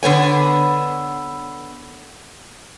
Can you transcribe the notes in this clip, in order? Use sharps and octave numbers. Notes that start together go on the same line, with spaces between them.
D3 B3 C#5 G#5